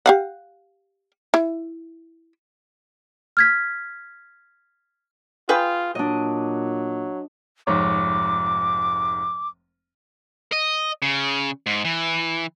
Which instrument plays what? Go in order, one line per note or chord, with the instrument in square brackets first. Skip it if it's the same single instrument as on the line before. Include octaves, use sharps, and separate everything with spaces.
[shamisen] G4 F5 F#5
E4
[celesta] F6 G#6 B6
[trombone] F4 [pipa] G#4 B4 G5
[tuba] A#2 [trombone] F#3 [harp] D4 D#5
[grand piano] F1 G#2 C#5 [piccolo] D6
[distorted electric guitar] D#5
C#3
G#2
E3